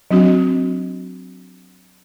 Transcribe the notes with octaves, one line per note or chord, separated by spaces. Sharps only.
F#3 C4 D4 F#4